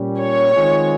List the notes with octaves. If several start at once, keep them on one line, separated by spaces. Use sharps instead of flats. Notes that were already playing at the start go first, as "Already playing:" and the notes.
Already playing: A#2 G3 C#4
C#5
D#3 G#3 C4 F4